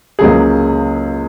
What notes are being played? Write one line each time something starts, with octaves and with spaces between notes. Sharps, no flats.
C#2 C#3 F#3 A#3 G#4